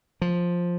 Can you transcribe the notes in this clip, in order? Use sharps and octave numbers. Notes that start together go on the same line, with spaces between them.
F3